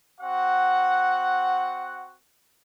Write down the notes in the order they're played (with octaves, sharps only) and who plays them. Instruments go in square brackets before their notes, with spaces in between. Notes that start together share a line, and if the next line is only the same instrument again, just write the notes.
[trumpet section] C4 F#4 F#5